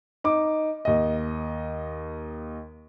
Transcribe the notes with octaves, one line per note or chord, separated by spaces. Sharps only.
D#4 D6
D#2 D#5